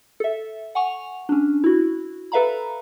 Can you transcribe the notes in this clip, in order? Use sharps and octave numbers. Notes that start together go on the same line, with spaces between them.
A4 E5
F#5 G#5 C#6 F7
C#4 D4
E4 F#4
A4 B4 E5 F5 A#5 B5